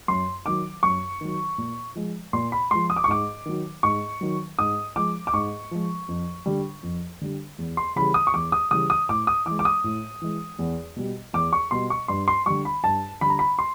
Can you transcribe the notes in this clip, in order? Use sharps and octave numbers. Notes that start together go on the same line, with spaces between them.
F#2 C6
D#3 F#3 D6
F#2 C#6
D#3 F#3
A#2
F3 G#3
A#2 C6
B5
F3 G#3 C6
D#6
D6
C#6
G#2 D6
D#3 F#3
G#2 C#6
D#3 F#3
G#2 D#6
F3 G#3 D6
D6
G#2 C#6
F3 G#3
F2
D3 G3
F2
D3 G3
E2
C6
C#3 E3 G3 B5
D#6
C#6
E2 D6
D#6
C#3 E3 G3 D#6
D#6
A2 D6
D#6
E3 G#3 D6
D6
D#6
A2
E3 G#3
E2
B2 G3
E2 D6
C#6
B2 G3 C6
C#6
G2 C6
C6
D3 G3 C#6
B5
G2 A5
D3 G3 B5
A#5
B5
C6